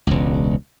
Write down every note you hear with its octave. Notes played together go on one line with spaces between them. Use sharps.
E1 C#2